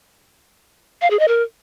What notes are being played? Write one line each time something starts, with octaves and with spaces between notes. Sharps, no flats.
F5
G#4
D#5
A#4